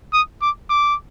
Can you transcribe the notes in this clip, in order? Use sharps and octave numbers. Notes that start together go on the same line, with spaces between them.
D#6
D6
D6